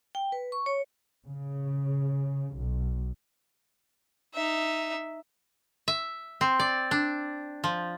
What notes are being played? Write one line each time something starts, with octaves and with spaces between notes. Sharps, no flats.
G5
B4
C#6
C#5
C#3
B1
D#4 E5
E5
C4
D5
D4
F3